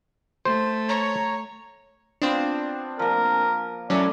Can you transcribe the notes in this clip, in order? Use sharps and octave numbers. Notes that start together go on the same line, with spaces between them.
A3 C5
C#5 A#5
B3 C4 D4 F4
F3 A#3 A#4
E3 F#3 A3 C#4 D5